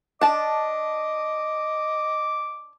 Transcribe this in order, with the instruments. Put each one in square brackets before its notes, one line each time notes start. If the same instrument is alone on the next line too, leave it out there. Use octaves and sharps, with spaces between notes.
[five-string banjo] D4 A5 [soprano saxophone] D#5 [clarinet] D6